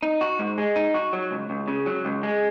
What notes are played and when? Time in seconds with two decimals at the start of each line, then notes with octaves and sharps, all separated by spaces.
0.03 D#4
0.21 F#4
0.39 G#2
0.58 G#3
0.76 D#4
0.94 F#4
1.13 F#3
1.31 C#2
1.50 C#2
1.68 C#3
1.86 F#3
2.05 C#2
2.23 G#3